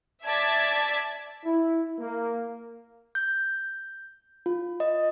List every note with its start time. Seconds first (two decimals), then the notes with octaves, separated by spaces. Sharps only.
0.25 D5 E5 A5 G#6 A6 B6
1.44 E4
1.99 A#3
3.15 G6
4.46 F4
4.80 D#5